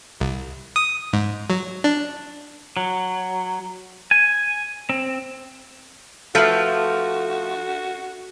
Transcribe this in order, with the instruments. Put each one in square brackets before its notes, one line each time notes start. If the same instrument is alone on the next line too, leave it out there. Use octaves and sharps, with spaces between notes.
[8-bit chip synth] C2
D#6
G#2
F#3
D4
[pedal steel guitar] F#3
G#5
C4
[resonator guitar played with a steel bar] F3 A3 F4 [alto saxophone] F#4 [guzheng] A4 B4 F5